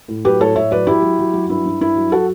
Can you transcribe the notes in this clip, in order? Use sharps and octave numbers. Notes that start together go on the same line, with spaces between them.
A2
F#3 G4 B4
A2 A4 C#5
A2 C#5 E5
F#3 B4 D5
F#3 E4 G4
F#3
F#3
F#3
G2 E4
G2
G2 E4
F#3
F#3 F#4 A4